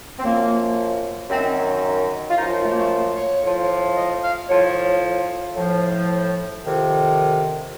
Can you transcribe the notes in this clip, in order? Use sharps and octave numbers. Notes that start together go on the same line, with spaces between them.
C4
F#2 F3 A#3
F#2 D#3 C4
F4
F#2 F3 D#4
A3
A#3
A3
C#5
A2 F3
D#5
F5
A2 F3 C#5
A2 F3
F2 C3 D#3